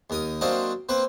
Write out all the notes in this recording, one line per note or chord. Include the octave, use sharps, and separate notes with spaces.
D#2 A#4 D#6
F#3 A#3 C4 D4 D#5 F5
A#3 C4 B4